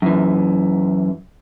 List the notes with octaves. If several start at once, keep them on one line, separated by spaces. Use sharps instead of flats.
F#2 E3